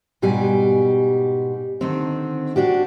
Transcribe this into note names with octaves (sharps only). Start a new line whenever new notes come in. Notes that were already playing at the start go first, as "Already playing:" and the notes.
G#2 B2 G3 G4 G#5
D3 D#3 C4
D4 F#4 G4